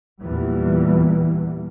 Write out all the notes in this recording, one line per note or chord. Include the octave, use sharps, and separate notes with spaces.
E2 A#2 E3 G3